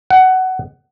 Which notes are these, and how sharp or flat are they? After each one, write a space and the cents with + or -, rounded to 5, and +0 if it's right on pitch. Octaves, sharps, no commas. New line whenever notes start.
F#5 +15